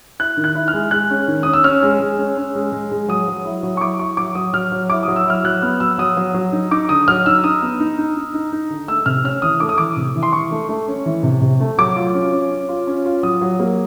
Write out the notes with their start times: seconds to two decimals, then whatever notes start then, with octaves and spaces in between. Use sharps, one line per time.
0.19 E4 F#6
0.37 D#3
0.44 F#6
0.55 E4
0.68 F6
0.73 G#3
0.91 G#3 F#6
1.10 C#4
1.28 D#3
1.43 C#4 D#6
1.53 E6
1.64 C#4 F6
1.83 G#3
2.00 G#3
2.18 C#4
2.37 C#4
2.55 G#3
2.72 G#3
2.91 G#3
3.08 F#3 D#6
3.28 F#3
3.45 E4
3.63 F#3
3.77 C#6
3.81 E4 D6
3.99 E4 C#6
4.17 F#3 D6
4.35 F#3 D#6
4.53 F#3 F6
4.72 F#3
4.90 E4 D6
5.03 F#3 D#6
5.16 E6
5.26 E4 F6
5.44 F#3 F#6
5.62 B3 F6
5.80 F#3 E6
5.98 F#3 D#6
6.17 F#3
6.34 F#3
6.52 D#4
6.71 D#4 D6
6.89 D3 D#6
7.08 F#3 F6
7.26 D#4 E6
7.44 D#4 D#6
7.62 B3
7.80 D#4
7.98 D#4
8.16 D#4
8.34 D#4
8.52 D#4
8.70 D3
8.88 A3 E6
9.06 C3 F6
9.24 C#4 F6
9.42 E3 D#6
9.60 A3 D6
9.69 D#6
9.78 E3 D6
9.97 C3
10.16 E3
10.23 C6
10.33 E3 C#6
10.51 A3
10.69 A3
10.88 C#4
11.06 E3
11.23 C3
11.41 C3
11.60 A3
11.78 F#3 D6
11.96 F4
12.14 C#4
12.32 C#4
12.51 C#4
12.69 F4
12.87 C#4
13.05 F4
13.23 F#3 D#6
13.41 F#3
13.60 A#3